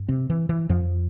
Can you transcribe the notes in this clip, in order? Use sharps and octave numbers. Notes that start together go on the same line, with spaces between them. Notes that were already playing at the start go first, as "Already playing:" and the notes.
Already playing: G2
C3 C4
E3
E3
F2 F3